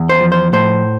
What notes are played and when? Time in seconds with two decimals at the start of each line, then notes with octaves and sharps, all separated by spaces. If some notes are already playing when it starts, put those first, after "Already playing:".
Already playing: E2
0.09 C5
0.21 F3
0.32 C5
0.53 A2 C5